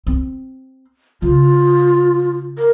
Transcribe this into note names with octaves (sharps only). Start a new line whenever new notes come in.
C4
C#3 F4
A#4